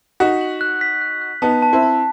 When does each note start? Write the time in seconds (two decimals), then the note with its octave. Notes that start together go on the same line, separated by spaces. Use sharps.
0.20 D#4 F#4 B6
0.41 F#7
0.61 F#6
0.81 B6
1.01 F#6
1.21 F#6
1.42 B3 D#4 A5
1.62 A5
1.73 C4 E4
1.83 A5